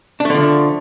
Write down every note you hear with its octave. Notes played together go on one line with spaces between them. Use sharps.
D3 F3 A3 D4